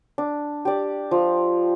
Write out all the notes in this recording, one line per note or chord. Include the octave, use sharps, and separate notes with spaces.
D4
G4 D5
F3